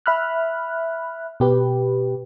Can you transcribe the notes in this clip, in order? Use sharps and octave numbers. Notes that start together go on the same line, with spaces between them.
E5 B5 F6 F#6
B2 G4 B4